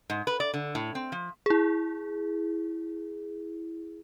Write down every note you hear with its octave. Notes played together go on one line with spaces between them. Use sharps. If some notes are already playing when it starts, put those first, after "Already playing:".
G#2
B4
D5
D3
A2
C4
F3
E4 G#4